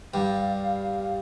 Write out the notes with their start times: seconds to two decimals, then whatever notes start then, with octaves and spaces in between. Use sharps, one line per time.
0.13 G2 G3 F5 G5